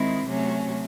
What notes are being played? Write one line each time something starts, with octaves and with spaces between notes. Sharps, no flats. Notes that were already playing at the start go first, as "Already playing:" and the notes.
Already playing: D#3 G#3 C4 E4
C3 F#3 A3 C#4